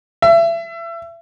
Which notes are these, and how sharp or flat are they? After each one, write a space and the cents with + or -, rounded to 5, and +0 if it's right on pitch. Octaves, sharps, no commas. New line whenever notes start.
E5 +30